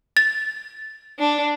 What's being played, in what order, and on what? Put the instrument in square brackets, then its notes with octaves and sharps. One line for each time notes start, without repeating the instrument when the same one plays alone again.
[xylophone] A6
[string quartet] D4